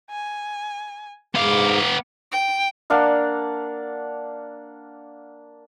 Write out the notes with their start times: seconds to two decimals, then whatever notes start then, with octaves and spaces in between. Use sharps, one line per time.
0.11 G#5
1.35 G#2 B3 F5 D6
2.32 G5
2.90 A#3 D4 F5 F#5